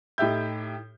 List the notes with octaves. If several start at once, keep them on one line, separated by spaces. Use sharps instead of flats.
A2 D#4 G4 E5 G6